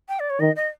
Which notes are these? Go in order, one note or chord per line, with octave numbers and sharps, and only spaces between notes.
G5
D5
C#5
D#3 D#5
D#5